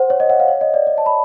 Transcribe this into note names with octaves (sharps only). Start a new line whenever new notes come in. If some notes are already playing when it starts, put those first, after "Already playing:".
Already playing: C5 F#5
C#5
D#5
F#5
F5
C#5
D#5
D5
D#5
A5
B5